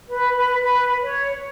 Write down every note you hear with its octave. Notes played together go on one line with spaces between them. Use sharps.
B4
B4
B4
C#5